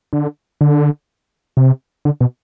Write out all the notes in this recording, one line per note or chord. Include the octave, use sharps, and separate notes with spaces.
D3
D3
C3
D3
B2